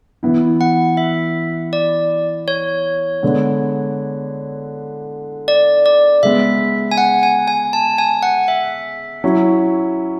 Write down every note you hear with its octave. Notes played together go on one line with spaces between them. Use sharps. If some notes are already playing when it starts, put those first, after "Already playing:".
E3 B3 E4
F#5
E5
D5
C#5
D3 G#3 B3
D5
D5
C#3 G#3 B3 E5
G#5
F#5
G#5
G#5
A5
G#5
F#5
E5
F#3 C#4 E4